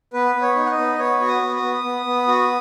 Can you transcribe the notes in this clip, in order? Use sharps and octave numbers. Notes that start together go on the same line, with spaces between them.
B3 B4
B3
C#5
D#4
F#5
D#5
B3
B3 C#5
F#4
D#6
B3
D#6
B3
B3
B3
F#4